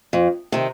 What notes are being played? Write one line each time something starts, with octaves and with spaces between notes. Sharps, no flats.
F2
C3 D#3